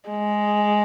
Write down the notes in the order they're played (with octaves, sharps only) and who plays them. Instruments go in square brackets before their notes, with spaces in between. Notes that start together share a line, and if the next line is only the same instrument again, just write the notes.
[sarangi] G#3